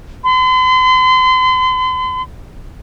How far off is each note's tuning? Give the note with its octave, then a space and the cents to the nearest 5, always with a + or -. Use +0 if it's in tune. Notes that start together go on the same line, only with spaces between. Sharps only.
C6 -40